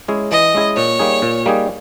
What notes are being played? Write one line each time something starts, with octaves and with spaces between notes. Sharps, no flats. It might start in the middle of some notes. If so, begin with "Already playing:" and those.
G#3 C#4 E4 G#4
E3 D#5
G#3 C#4 E4 G#4
A#2 C#5
G3 A#3 D#4 G#4
A#2
G3 A#3 D#4 G#4